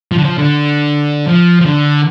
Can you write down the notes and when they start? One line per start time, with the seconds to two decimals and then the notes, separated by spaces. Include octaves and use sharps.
0.12 F3
0.18 D3
0.25 F3
0.38 D3
1.27 F3
1.60 F3
1.65 D3